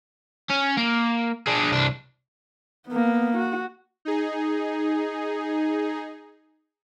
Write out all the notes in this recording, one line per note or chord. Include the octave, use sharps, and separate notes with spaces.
C#4
A#3
D4 G#4
C2 D4
A#3 B3
F#4
D#4 G#4